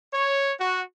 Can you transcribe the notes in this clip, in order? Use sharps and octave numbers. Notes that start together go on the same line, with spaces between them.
C#5
F#4